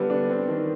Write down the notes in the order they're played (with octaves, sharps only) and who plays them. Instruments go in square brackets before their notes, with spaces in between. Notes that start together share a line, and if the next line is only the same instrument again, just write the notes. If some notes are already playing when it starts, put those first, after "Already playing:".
Already playing: [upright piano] D3 G3 B3 [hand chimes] B4
[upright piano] D4
C4
D#3